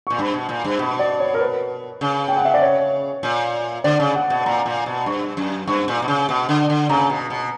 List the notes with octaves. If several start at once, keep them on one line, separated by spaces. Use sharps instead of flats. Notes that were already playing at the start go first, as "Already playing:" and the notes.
A#2 C#6
G2 B5
B2
A#2
G2
B2 B5
D5
C#5
A#4
B4
C#3
G5
F#5
E5
D5
C#5
A#2
D3 D5
C#3
F#5
B2
A#2 A#5
A#2
B2
G2 C#6
F#2
G2 C#6
A#2
B2
C#3
B2
D3
D3
C#3 A#5
B2
B2